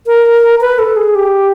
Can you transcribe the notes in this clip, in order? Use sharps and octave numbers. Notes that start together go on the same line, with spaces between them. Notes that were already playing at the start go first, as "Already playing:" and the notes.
A#4
B4
A4
G#4
G4